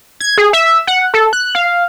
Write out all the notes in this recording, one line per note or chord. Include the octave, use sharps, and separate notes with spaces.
G#6
G#4
E5
F#5
A4
F#6
F5